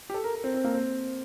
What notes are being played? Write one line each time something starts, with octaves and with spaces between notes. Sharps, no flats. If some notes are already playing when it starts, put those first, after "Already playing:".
G4
A4
A#4
A#4
C4
C4
A#3
C4